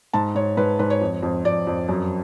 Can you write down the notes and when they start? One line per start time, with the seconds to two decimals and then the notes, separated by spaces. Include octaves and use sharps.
0.13 G#2 A5
0.35 G#2 C#5
0.57 G#2 B4
0.79 G#2 B4
0.90 C#5
1.01 F2
1.23 F2
1.45 F2 D5
1.67 F2
1.89 F#2